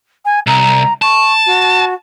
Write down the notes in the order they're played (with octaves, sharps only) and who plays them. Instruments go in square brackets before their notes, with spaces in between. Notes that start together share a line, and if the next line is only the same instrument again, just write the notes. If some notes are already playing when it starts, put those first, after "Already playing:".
[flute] G#5
[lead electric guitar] C2 [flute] A#5
[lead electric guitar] A5 [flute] C#6
[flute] F#4